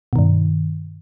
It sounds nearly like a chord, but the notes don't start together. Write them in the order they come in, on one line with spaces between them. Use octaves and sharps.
B2 D#3 G2